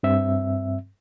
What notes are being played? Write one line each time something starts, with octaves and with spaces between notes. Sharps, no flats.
G2 C4 E5